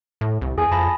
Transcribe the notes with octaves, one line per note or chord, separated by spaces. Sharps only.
A2
C2
E2 G#4 G#5
F2 A5 B5 A#6